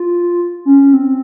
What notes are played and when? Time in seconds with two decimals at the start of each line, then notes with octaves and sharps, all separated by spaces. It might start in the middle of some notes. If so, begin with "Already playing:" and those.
Already playing: F4
0.65 C#4
0.94 C4